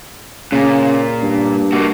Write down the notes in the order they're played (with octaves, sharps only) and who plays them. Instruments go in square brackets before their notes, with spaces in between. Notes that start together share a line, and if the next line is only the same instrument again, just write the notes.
[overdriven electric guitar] A#2 [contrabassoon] C#3
[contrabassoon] G2
[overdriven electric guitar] A#3 F#4